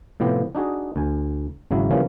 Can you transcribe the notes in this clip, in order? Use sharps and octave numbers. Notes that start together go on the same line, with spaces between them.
A2 C3 F3 B3 G4
D4 D#4 F#4 G#4
D2 G#5
G#1 C#3 F#3 E4
C#3 E3 F3 G3 A#3 C#4